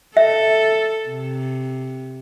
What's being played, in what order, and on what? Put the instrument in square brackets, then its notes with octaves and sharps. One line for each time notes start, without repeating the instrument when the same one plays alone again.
[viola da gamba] A4 [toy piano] E5
[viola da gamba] C3